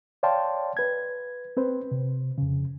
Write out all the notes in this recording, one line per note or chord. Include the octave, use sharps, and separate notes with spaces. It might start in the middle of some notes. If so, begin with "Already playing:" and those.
C#5 D5 F5 G5 A5 C6
B4 G#6
C4 B4 C5
C3
F2 C#3